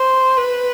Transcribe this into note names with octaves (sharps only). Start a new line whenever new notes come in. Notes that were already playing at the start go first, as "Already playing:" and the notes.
Already playing: C5
B4